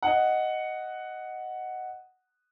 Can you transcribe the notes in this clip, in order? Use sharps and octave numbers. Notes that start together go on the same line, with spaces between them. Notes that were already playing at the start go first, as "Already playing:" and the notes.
D#5 F#5